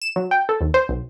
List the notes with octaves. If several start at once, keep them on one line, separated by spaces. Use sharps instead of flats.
E7
F#3
G5
A4
D#2
C5
B1